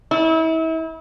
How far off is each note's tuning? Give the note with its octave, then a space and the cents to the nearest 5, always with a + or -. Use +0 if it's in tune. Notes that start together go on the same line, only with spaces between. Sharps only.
E4 -35